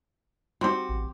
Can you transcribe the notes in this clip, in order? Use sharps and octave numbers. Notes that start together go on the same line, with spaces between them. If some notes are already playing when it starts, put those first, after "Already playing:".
C4 F#4 G4
A1